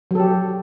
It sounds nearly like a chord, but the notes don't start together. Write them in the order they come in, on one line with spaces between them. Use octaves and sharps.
F#3 A4 G4